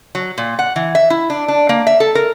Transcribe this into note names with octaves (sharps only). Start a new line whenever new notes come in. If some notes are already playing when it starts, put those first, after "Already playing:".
F#3
A#2
F#5
E3
E5
E4
D4
D4
A#3
E5
A4
A#4